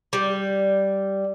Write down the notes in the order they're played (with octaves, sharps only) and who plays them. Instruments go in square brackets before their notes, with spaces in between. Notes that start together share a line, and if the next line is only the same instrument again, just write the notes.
[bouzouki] G3